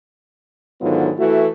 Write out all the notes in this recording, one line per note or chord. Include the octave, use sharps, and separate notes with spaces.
G#2 D3 D#3 F#3 B3 F4
E3 A3 F#4